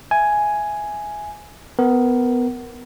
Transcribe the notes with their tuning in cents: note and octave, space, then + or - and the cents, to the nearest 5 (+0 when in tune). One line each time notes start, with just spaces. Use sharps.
E5 +15 G#5 +5
B3 +15 A#4 +0